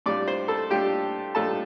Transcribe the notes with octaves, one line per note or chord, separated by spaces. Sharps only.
A2 G3 D4 F4 D5 D6
C5 C6
A4 A5
A2 G3 D4 F4 G4 G5
A2 G3 D4 F4 A4 A5